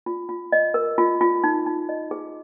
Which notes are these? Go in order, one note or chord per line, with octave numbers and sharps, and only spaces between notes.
F4
F4
D#5
A#4
F4
F4
D#4
D#4
D#5
G#4